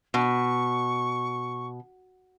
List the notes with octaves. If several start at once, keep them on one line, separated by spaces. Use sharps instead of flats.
B2 C#6